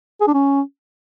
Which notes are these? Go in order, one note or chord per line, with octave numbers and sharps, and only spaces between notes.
G#4
D4
C#4